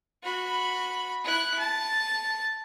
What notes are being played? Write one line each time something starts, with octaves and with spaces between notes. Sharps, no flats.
F#4 B5
E4 F#6
A5